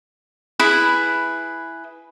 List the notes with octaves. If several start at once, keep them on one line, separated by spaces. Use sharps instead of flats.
E4 G#4 B4